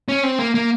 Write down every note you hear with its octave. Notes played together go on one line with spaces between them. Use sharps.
C#4
C4
A#3
A#3